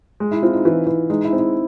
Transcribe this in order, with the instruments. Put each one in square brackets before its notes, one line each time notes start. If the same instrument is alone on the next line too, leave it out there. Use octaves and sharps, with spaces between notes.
[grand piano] G#3
[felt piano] E4
[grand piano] C4 [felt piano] F4
[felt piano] D#4
[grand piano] E3 [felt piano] F4
[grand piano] E3 [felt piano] E4
[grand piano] G#3 [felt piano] D#4
[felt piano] E4
[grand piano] C4
[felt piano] E4